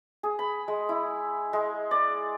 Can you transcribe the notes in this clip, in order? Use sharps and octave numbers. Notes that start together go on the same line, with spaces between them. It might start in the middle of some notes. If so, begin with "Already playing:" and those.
G#4
B5
G#3
E4
G#3
D5